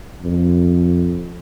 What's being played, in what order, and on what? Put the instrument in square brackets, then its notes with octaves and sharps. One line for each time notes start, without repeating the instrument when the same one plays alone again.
[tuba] F2